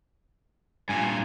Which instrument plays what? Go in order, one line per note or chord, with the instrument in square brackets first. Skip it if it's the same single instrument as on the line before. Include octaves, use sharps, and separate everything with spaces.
[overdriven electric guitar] G2 A#2 [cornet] G#5